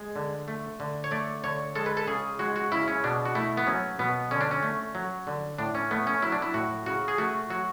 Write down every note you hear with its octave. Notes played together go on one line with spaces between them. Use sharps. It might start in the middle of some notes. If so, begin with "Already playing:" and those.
Already playing: G#3
D3
A3
D3
C#5
A3 D5
D3 C#5
G#3 A4
B4
A4
C#3 G#4
G#3 F#4
F#4
C#3 E4
C#4
B2 D4
F#4
A3 E4
B3
F#3 C#4
B2 B3
D3 C#4
D4
C#4
A3
F#3
D3
A2 D4
C#4
A3 B3
C#4
F#3 E4
D4
E4
A2 F#4
C#3 F#4
G#4
A3 F#4
F#3 F#4